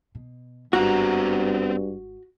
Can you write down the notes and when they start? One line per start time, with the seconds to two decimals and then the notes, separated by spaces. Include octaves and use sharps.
0.15 B2
0.73 G#1 G2 B3 C4 F#4 A#5